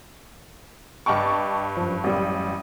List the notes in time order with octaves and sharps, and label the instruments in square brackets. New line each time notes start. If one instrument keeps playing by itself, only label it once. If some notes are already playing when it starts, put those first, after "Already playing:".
[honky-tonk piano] G2 A5 C#6 [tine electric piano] D#5 G5 D6
[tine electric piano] F#2 F3
[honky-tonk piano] A1 G3 [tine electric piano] F#2